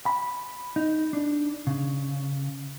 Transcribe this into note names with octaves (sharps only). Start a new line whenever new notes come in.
B5
D#4
D4
C#3